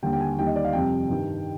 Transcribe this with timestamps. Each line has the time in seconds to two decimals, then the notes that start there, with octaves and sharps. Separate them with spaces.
0.03 D#2 D3 G3 G5
0.13 G5
0.21 G#5
0.37 D#2 D#3 G3 G5
0.47 D#5
0.56 D5
0.64 F5
0.73 F2 C3 G3 G5
1.09 G2 D#3 G3